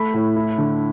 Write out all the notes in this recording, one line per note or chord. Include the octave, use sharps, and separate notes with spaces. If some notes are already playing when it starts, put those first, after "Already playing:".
Already playing: A3 B5
A2
E4
D3